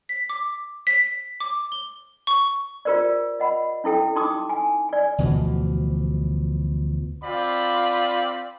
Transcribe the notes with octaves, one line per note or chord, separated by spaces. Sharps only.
B6
D6
B6
D6
G7
C#6
F4 G4 A#4 C5 D5
D#5 F#5 B5
C#4 E4 A4 G5
D#4 G4 A5 C6 D6 D#6
G#5
D5 G#5
D2 B2 E3 F3
C4 F4 D5 B5